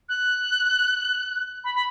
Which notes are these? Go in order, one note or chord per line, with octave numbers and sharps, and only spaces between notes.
F#6
B5
B5